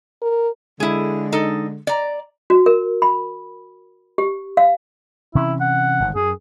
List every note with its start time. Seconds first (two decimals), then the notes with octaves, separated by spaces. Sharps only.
0.22 A#4
0.80 D3 G#3 E4 G#4
1.32 D#4 A4
1.87 D5 A#5
2.50 F#4
2.66 A#4
3.02 B5
4.18 G4
4.57 F5
5.35 C3 E3 C#4 E4
5.60 F#5
6.00 G1 G#2 D#3
6.15 F#2 G#4